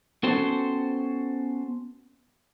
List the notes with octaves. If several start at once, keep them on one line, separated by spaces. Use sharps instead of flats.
B3 C#4 F#4 A4 C5 G5